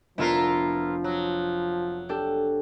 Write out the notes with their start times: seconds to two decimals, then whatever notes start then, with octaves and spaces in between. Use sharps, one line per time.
0.18 F1 F3 B3 D4 E4 F4 A#4
1.04 F#3
2.09 D4 G4 A4